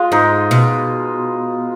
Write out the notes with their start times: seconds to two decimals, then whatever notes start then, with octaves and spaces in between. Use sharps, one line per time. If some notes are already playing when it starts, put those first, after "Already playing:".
Already playing: G#3 F4
0.12 G#2 D#4
0.51 B2